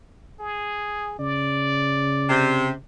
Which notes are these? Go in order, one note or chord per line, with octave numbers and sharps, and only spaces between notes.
G#4
C#3 D5
C3